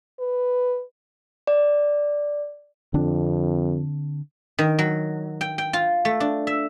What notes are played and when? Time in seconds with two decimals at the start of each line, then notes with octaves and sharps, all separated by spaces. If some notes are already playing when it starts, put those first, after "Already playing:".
0.20 B4
1.47 D5
2.94 F2 D3 C4 D4
4.59 D#3
4.79 F#3
5.41 G5
5.58 G5
5.73 F4
6.05 A3
6.20 D4
6.47 E5